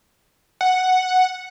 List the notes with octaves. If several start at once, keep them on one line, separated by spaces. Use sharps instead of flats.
F#5